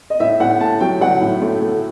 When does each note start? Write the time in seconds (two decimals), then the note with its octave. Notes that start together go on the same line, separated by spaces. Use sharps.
0.10 D#5
0.20 A2 E5
0.40 A2 F#5
0.61 A3 A5
0.80 F#3 G5
1.01 F#3 F#5
1.21 A2
1.42 A3
1.62 A3